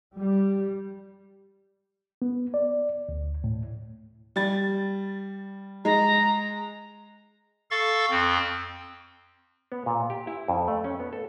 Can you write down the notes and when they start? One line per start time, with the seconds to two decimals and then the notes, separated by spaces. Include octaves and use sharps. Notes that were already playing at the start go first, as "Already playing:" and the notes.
0.18 G3
2.22 B3
2.54 D5
3.09 D2
3.44 A2
4.36 G3 A6
5.85 G#3 A#5
7.71 A4 F5 C#6 A6
8.11 F2 C4
9.72 B3
9.86 A#2
10.10 G4
10.27 E4
10.48 F2
10.68 A3
10.84 C#4
11.00 B3
11.13 A4